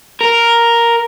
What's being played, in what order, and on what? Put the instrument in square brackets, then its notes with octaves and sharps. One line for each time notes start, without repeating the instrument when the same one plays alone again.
[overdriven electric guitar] A#4